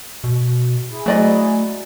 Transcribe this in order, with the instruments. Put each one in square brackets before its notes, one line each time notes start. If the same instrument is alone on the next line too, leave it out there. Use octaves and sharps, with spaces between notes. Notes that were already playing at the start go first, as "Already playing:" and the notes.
[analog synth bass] B2
[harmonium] E4 G#4
[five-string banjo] F#3 D5 D#5 [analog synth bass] A3